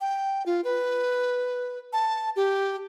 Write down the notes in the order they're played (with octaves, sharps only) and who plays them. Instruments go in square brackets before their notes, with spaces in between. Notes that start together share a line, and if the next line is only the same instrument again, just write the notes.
[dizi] G5
F4
B4
A5
G4